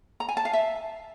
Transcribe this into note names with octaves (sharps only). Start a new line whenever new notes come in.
A#5
G#5
A5
F5
E5